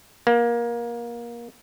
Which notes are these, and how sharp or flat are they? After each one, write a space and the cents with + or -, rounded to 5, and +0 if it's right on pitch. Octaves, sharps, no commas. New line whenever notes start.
A#3 +20